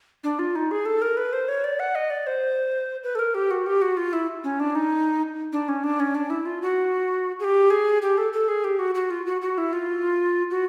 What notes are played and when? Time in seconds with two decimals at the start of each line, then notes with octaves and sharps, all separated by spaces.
0.24 D4
0.39 F4
0.55 D#4
0.71 G#4
0.85 A4
1.02 A#4
1.17 B4
1.33 C5
1.48 C#5
1.64 D5
1.80 F#5
1.95 D#5
2.10 D5
2.27 C5
3.04 B4
3.15 A4
3.19 A#4
3.34 G4
3.51 F#4
3.66 G4
3.82 F#4
3.97 F4
4.13 E4
4.44 C#4
4.60 D4
4.75 D#4
5.52 D4
5.68 C#4
5.84 D4
6.00 C#4
6.15 D4
6.30 E4
6.45 F4
6.62 F#4
7.40 G#4
7.44 G4
7.70 G#4
8.02 G4
8.18 A4
8.33 A4
8.48 G#4
8.64 G4
8.79 F#4
8.95 F#4
9.10 F4
9.26 F#4
9.42 F#4
9.58 E4
9.73 F4
10.51 F#4